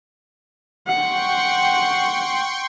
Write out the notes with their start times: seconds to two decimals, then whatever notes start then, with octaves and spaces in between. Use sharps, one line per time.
0.88 F#5 G5 C6 C#6